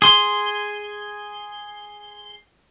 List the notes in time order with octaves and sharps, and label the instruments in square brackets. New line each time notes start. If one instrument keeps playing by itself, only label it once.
[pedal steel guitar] G#4 C6